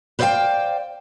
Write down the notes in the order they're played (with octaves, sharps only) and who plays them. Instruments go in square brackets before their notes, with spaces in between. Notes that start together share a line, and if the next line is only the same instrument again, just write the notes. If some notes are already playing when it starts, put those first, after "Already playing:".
[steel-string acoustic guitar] B4 C5 D5 E5 F5 G5